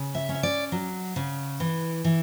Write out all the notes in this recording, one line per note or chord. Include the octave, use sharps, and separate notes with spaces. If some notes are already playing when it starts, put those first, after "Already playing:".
Already playing: C#3
E5
C#4
E5
D5
F#3
C#3
E3
E3